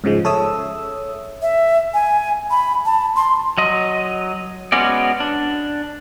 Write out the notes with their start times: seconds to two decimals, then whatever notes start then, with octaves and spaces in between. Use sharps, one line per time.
0.04 G#2 C#3 F3 G#3
0.25 A4 C#5 E5 D#6 E6
1.42 E5
1.94 G#5
2.51 B5
2.85 A5
3.16 C6
3.58 F#3 D#5
4.72 G#3 B3 C#4 F#4 D5
5.20 D4